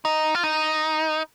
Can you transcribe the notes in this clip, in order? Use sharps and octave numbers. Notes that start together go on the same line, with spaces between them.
D#4
F4
D#4